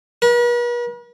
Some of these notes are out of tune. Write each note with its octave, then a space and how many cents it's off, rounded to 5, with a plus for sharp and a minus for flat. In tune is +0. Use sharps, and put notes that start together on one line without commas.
B4 -45